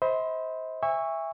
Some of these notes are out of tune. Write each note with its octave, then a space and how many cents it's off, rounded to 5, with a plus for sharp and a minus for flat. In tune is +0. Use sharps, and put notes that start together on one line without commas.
C5 +0 D#5 +45 B5 +10
E5 +0 G#5 -35 C#6 +0